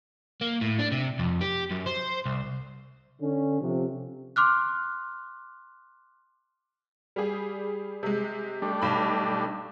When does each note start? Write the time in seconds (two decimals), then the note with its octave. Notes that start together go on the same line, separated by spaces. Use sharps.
0.41 A#3
0.61 A2
0.79 D4
0.92 C3
1.19 F2
1.41 G4
1.70 F#2
1.86 C5
2.25 C2
3.21 D3 C#4
3.61 C3 F3
4.36 C6 D6 F6 F#6
7.16 G3 G4 G#4
8.03 C3 G#3
8.62 G3 A3 D4
8.81 B1 B5